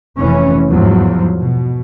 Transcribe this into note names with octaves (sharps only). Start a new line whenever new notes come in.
F1 E3 C#4
E2 G#2 F3 F#3
B2